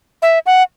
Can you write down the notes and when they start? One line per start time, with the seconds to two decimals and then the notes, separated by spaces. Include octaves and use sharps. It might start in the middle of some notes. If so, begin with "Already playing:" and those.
0.22 E5
0.46 F#5